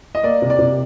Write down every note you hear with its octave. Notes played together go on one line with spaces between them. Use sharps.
D#5
A#3 D5
C3
D5
C3